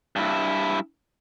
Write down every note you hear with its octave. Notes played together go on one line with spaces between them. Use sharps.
G2 E4